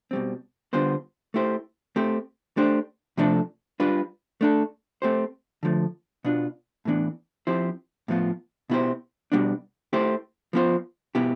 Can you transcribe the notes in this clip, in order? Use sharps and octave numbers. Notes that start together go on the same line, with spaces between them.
B2 G3 C4
D3 G3 B3 F4 C5
A3 E4 G4 C5
A3 C4 G4 C5
A3 D4 G4 C5
C3 F3 A3 D4 A4
G3 D4 F4 B4
A3 D4 A4
A3 C4 G4 C5
D3 F3 A3
B2 B3 D4 F4
A2 E3 B3 D4
F3 C4 E4 G4 C5
A2 F3 B3 F4
B2 B3 E4 G4 C5
B2 G3 B3 D4
A3 E4 G4 C5
F3 B3 F4 C5
B2 B3 E4 G4